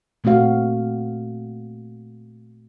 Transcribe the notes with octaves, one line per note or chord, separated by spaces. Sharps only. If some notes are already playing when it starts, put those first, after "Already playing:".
A#2 A3 C4 F#4 F5